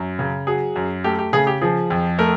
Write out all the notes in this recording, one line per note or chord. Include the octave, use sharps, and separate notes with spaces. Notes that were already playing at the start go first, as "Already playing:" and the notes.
Already playing: F#2
C#3
F#3 G#4
F#2
A3 G4
G4
C#3 G#4
G4
F3 G#4
F2
A3 A#4